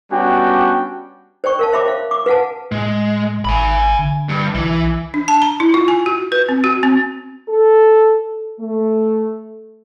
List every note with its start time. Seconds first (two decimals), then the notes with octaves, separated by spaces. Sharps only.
0.11 G3 B3 C#4 D4 F#4 G5
1.44 C5 D5 G5 C#6
1.59 A#4 F5 A5
1.72 C5 C#5 E5 G5 B5 D6
1.86 C5 F5
2.11 D6
2.26 B4 F5 F#5 G#5 A5
2.72 A2 G#3
3.45 G#1 G#5 B5
3.99 D3
4.29 G2
4.55 B1 E3
5.14 D4
5.28 A5
5.42 A#5
5.60 E4
5.74 F4
5.88 G#5
6.06 F#4
6.32 B4
6.49 C4
6.64 F#4
6.83 C4
7.49 A4
8.60 A3